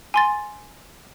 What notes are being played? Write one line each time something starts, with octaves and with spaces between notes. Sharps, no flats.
G#5 C6 A6